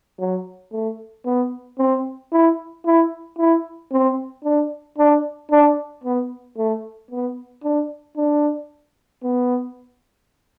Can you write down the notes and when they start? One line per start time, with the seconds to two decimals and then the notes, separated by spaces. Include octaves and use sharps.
0.19 F#3
0.72 A3
1.25 B3
1.78 C4
2.32 E4
2.86 E4
3.38 E4
3.92 C4
4.44 D4
4.98 D4
5.51 D4
6.04 B3
6.57 A3
7.11 B3
7.63 D4
8.16 D4
9.23 B3